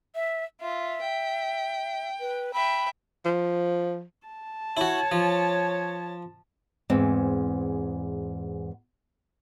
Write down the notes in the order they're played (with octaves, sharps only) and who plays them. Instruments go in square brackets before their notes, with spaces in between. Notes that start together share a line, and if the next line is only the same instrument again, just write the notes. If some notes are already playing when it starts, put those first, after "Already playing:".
[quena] E5
[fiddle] F4 [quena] E5
[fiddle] G5
[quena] B4
[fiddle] E5 G5 [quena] B5
[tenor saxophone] F3
[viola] A5
[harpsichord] E4 F#4 [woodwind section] C#5
[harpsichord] F3
[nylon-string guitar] E2 G#2 C4